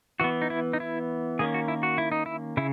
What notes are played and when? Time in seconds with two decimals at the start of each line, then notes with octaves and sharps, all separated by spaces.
0.20 E3 B3 F#4
0.42 D#4
0.50 E4
0.73 D#4
0.80 E4
1.39 D#3 A#3 C#4 G#4
1.54 F#4
1.68 E4
1.83 F#4
1.98 E4
2.12 D#4
2.26 E4
2.57 C#3 E4